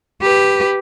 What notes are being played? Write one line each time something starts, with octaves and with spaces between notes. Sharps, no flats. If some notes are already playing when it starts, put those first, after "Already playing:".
G4 B4